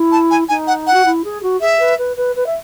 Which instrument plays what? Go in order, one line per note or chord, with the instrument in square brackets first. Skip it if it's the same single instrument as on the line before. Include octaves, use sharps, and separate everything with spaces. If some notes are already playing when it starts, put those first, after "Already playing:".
Already playing: [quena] E4
[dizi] A5
G#5
[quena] D#4 [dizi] G#5
[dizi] F#5
F#5
[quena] F#4
E4
G#4
F#4
[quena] G#4 [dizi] E5
[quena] B4
B4
B4
B4
E5